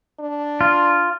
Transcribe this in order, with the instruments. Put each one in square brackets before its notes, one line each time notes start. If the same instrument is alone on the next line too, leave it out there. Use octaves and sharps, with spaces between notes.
[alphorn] D4
[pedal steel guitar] F4